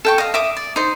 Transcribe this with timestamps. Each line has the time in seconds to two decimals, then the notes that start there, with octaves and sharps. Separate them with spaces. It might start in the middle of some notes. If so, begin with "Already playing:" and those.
0.05 A4 G5 C#6
0.18 D#5 F5
0.34 E5 D6 D#6
0.57 D5
0.76 D#4 C5